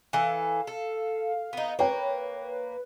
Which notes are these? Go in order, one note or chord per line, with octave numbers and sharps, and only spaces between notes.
E3 A4 F5
A4
B3 D#4
A#3 B4 C#5 G5